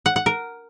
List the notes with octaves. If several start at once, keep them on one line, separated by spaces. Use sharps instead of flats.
F#5
F#5
A#4